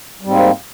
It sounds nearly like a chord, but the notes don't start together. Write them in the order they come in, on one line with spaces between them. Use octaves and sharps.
G3 G#2 C4 A#3